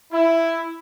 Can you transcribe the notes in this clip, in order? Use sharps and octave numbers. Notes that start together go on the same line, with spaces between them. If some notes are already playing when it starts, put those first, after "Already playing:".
E4